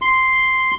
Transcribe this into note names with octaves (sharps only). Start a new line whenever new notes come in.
C6